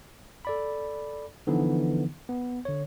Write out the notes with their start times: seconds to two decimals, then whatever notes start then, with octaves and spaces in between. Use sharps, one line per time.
0.45 A4 D5 B5
1.47 D3 E3 F3 B3 D#4
2.29 B3
2.65 D3 C#5